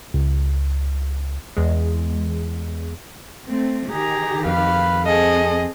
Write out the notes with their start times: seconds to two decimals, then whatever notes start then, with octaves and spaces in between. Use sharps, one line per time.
0.14 C#2
1.57 E2 G#3
3.48 A3 C4
3.91 D#3 G4 G#4 A#5
4.46 F2 B4 F5
5.07 C4 G#4 A4 D#5